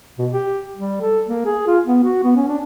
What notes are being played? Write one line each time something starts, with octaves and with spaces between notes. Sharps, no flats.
B2
G4
G3
A4
A#3
G#4
F4
B3
F#4
B3
C#4
D4